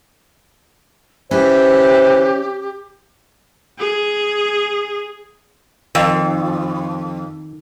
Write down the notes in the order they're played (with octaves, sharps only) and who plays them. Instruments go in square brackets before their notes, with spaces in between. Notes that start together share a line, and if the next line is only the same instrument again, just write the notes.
[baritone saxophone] E3 [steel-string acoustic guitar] C#4 [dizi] G4 [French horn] C5
[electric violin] G#4
[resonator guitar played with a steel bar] F2 [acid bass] D#3